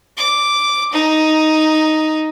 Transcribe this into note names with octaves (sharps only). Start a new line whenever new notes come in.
D6
D#4